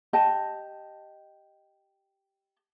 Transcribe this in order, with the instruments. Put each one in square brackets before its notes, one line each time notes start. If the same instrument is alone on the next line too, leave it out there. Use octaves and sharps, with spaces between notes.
[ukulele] G4 D#5 A5